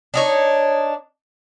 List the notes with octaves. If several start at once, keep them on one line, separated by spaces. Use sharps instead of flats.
D4 D#4 C#5